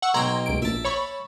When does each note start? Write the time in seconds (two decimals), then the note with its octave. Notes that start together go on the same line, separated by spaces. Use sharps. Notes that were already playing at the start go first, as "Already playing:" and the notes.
0.02 F#5 C#6 E6
0.14 B1 G5 A#5 C6 G#6
0.46 C#2 D7
0.62 A#1 E5 A5
0.85 C#5 B5 C#6